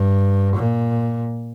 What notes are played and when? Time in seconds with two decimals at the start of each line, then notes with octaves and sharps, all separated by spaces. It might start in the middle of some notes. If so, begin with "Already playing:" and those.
Already playing: G2
0.56 A#2